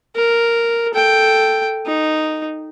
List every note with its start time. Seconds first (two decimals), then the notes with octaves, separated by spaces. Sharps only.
0.16 A#4
0.94 A4 G5
1.86 D#4